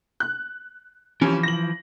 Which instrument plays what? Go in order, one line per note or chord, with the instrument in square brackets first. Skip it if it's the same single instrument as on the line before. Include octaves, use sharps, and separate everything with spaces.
[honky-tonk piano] F#6
[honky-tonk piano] C3 C#4 [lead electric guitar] E3 F3
[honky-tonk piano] A#6 F#7